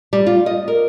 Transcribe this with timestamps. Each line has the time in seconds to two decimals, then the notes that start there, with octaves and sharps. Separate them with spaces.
0.13 G3
0.27 F4
0.46 D#5
0.68 A#4